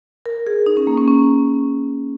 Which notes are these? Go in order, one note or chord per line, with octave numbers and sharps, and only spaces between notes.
A#4
G#4
D#4
C#4
A#3
C#4
C#4